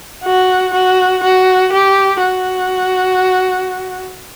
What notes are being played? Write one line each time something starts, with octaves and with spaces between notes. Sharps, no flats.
F#4
F#4
F#4
G4
F#4